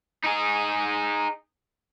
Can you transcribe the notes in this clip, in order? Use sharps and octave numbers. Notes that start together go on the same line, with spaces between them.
D#4 G#4